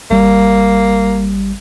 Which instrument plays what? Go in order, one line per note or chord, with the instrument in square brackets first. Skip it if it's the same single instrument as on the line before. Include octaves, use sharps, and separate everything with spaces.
[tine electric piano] G#1 G3 [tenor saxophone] A#3